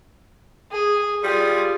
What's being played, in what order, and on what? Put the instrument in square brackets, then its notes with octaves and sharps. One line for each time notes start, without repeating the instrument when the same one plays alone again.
[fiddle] G#4
[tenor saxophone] G3 [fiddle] F4 G#4